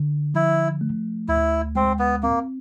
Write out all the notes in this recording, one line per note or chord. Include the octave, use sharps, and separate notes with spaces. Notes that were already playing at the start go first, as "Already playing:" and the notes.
Already playing: D3
F3 E4
A3
D2 E4
G#3 C4
B3
A#3 C4